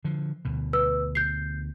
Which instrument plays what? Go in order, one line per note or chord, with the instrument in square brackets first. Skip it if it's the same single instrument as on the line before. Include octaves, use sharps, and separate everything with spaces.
[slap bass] D3 F3
D2 B2
[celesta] B4 E6
G6 C7